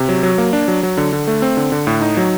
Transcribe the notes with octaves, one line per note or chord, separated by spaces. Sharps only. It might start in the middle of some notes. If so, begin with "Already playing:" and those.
Already playing: C3
F#3
F#3
A#3
D4
F#3
F#3
D3
D3
A3
C4
D3
D3
A2
D#4
F#3